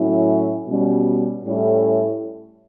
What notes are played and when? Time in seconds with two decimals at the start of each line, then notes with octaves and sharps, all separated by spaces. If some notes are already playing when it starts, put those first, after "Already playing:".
Already playing: A2 F#3 C#4 E4
0.68 B2 G3 C#4
1.45 A2 G3 C#4 E4 A4